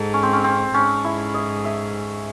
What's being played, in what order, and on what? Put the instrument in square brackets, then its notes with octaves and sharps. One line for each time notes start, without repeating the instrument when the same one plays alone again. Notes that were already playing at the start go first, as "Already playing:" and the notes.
Already playing: [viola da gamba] G#2 [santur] A4
[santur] C#4
C4
C#4
C4
[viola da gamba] G#2 [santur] C#4
[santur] E4
D#5
E5